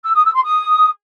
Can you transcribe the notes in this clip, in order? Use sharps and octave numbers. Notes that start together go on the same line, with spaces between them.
E6
D#6
E6
C6
D#6